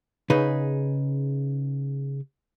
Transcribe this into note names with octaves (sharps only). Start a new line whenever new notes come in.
C#3 D#4 G#4 B4